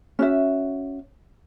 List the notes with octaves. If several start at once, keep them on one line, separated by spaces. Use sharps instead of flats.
C#4 F#4 E5